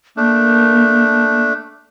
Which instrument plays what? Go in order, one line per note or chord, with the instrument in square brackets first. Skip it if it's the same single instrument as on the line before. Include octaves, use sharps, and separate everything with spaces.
[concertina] A3 D4 [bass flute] A#3